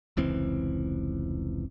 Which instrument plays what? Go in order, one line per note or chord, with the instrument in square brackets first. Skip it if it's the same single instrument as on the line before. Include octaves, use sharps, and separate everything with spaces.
[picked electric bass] F1 C#2 E3 C4